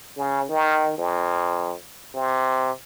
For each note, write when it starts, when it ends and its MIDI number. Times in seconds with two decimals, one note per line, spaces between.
0.17 0.45 49
0.49 0.94 51
0.98 1.75 41
2.15 2.71 48